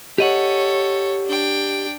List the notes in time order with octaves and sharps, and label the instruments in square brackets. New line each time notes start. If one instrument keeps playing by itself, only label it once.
[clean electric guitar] G4 D#5 F#5 [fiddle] A4 C#5
[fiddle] D4 G5